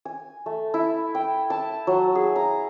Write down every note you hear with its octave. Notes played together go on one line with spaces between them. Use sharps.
G#5
A3
E4
G5
A5
F#3
G#4
A#5